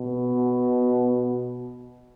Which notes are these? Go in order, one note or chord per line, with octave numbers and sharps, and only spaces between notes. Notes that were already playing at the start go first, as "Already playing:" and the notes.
Already playing: B2